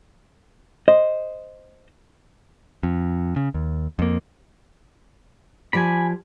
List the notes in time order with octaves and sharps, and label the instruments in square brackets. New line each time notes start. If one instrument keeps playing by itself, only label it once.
[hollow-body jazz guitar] C5 D#5
[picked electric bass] F2
C#3
D#2
F2 A#3
[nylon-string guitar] F3 G4 D5 [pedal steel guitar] G#5 B5